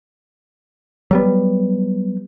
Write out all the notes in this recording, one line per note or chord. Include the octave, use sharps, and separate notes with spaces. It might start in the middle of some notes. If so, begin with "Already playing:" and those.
F#3 G3 B3